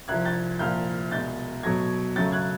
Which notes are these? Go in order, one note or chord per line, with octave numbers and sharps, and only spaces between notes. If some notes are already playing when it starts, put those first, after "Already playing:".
C2 C3 F3 F#6 G#6
G6 A6
C2 A#2 F3 F6 G6
C2 B2 G#3 G6 A6
B2 F#3 A3 G#6 A#6
F#2 C#3 F#3 A3 G6 A6
F#6 G#6